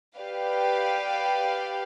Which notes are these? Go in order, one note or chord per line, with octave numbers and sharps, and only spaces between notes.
G4 B4 D5 F5